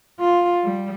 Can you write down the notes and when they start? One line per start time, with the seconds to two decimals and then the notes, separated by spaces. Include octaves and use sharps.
0.20 F4
0.63 G3